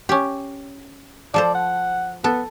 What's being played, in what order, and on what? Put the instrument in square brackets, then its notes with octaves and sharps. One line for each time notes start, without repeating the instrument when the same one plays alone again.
[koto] C#4 G4
[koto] F3 A4 C5 [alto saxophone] D5
[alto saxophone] F#5
[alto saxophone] B3 [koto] A4